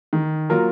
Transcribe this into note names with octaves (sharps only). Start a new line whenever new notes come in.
D#3
F#3 A#3 F4 A#4